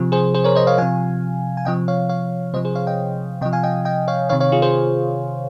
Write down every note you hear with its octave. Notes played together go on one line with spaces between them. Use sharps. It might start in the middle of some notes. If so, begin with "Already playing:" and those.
Already playing: C3 F3
G#4 C5
G#4 C5
A#4 C#5
C5 D#5
C#5 F5
C3 F3 F5 G#5
G#5
C3 F3 D#5 G5
C#5 F5
C#5 F5
C3 F3 C5 D#5
G#4 C5
C#5 F5
D#5 G5
C3 F3 D#5 G5
F5 G#5
D#5 G5
D#5 G5
C#5 F5
C3 D#3 C#5 F5
C#5 F5
F4 G#4
G#4 C5